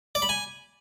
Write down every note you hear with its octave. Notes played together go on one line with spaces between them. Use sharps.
D5
B5
G#5